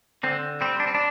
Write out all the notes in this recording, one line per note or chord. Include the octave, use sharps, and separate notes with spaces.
D3 C4
G3 C4
D4
C4
D4